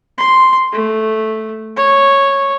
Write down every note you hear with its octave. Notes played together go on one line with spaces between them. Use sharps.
C6
A3
C#5